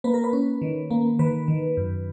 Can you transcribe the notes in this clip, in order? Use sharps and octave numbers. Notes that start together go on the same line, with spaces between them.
A#3 B4
A#4
B4
C#4
D#3
A#3
D#3 B4
D#3
F#2